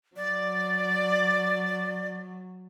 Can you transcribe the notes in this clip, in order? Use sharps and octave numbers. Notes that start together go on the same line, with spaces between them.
F#3 D5